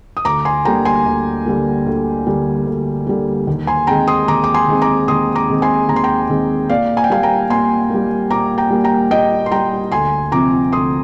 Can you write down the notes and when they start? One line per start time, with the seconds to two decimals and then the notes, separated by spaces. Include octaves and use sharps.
0.17 D#6
0.25 D2 A#5 D6
0.45 G#5 C6
0.65 D3 G3 A#3 G5 A#5
0.85 G#5 C6
1.06 D2
1.46 D3 G3 A#3
1.86 D2
2.27 D3 G3 A#3
2.66 D2
3.07 D3 G3 A#3
3.47 D#2
3.67 G#5 C6
3.87 D#3 G#3 C4 G5 A#5
4.08 C6 D#6
4.28 D#2 A#5 D6
4.44 D6
4.54 G#5 C6
4.68 D#3 G#3 C4
4.82 A#5 D6
5.08 D#2 C6 D#6
5.35 A#5 D6
5.49 D#3 G#3 C4
5.62 G#5 C6
5.89 D#2 A#5
5.96 C6
6.04 G5 A#5
6.29 D#3 G#3 C4
6.69 A#2 D5 F5
6.97 G#5
7.04 G5
7.10 G3 A#3 F5 G#5
7.23 G5 A#5
7.50 A#2 G#5 C6
7.90 G3 A#3
8.30 A#2 A#5 D6
8.58 G5 A#5
8.70 G3 A#3
8.84 G5 A#5
9.11 A#2 D#5 G5
9.46 C6
9.51 G3 A#3 G5 A#5
9.92 D2 G#5 C6
10.32 C3 F3 C4 A#5 D6
10.72 D2 C6 D#6